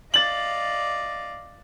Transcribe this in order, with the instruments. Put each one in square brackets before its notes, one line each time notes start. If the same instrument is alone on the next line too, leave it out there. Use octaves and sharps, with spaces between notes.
[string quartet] D5 D#5 F5 [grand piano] A6 F#7